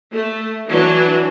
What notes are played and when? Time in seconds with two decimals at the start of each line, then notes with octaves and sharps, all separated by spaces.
0.12 A3
0.67 E3 F#3 D4